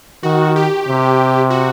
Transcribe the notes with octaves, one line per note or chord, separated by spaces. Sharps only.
D#3 F#4
G4
C3
F#4